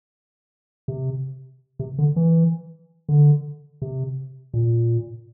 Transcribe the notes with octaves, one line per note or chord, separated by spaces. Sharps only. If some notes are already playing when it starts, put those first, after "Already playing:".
C3
C3
D3
E3
D3
C3
A#2